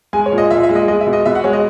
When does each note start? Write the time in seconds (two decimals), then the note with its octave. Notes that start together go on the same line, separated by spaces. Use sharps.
0.13 G#3 G#5
0.26 C#5
0.32 A#2
0.38 D#5
0.50 A#2 E5
0.63 E5
0.69 G#3
0.75 D#5
0.88 G#3 D#5
1.01 E5
1.06 B2
1.13 D#5
1.26 B2 E5
1.35 F#5
1.44 G#3 C#5
1.53 D#5